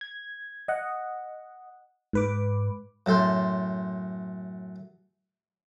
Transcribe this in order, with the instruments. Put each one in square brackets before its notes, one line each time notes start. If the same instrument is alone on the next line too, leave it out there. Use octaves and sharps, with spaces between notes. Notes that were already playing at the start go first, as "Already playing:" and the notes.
[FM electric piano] G#6
D#5 F#5
G#2 B4 D6
[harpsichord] F#2 A2 A4 C6